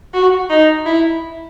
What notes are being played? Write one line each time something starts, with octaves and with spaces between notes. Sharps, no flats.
F#4
D#4
E4